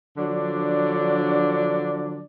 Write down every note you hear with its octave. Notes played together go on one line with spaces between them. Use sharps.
D3 F3 F#3 D4 D5